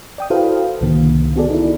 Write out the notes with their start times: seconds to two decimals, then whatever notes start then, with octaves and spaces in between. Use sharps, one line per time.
0.18 D5 G5 D#6
0.30 E4 F#4 A4 B4 C5 F5
0.81 C2 A2 D3 D#3 A#3
1.36 B3 F#4 G#4 A4 D5
1.50 D#4 E4